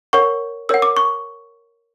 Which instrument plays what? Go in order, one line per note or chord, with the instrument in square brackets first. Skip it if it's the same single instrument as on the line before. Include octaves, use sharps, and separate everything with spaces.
[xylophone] A#4 C#5 F#5 C#6
A#4 C#5 F#5 E6
D6
C#6